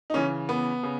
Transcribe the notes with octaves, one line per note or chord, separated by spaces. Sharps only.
D#4
C#3 E3 C#4
B3
C#3